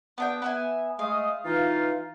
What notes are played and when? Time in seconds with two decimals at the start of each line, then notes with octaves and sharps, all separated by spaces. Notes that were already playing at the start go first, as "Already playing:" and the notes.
0.18 B3 D4 G5
0.42 B3 E5 G#5
0.99 G#3 A3 F5 D#6
1.45 E3 D#4 F4